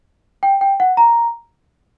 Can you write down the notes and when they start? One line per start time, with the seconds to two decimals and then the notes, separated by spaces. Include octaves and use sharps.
0.43 G5
0.61 G5
0.80 F#5
0.97 A#5